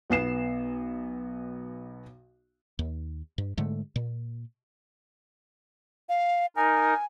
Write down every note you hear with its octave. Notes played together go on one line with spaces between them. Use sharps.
B1 B3 C7 E7
D#2
G2
G#2 D3 G#3 A3
A#2
F5
D#4 A#4 G#5